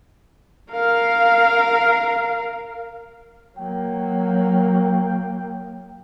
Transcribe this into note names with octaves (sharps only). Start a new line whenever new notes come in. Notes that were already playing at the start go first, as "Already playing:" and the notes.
A#4 F5
F#3 A#3 G5